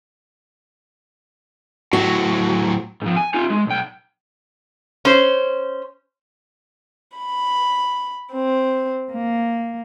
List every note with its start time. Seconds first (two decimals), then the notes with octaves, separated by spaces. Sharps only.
1.93 A2 F#3 F#4
3.02 G#2 F3
3.17 G#5
3.34 D#4 F4
3.50 G#3
3.67 B1 G5
5.05 C#4 C5
7.16 B5
8.32 C4
9.12 A#3